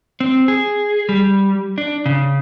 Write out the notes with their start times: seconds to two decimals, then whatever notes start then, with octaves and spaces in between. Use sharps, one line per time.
0.20 C4
0.48 G#4
1.09 G3
1.78 D4
2.06 C#3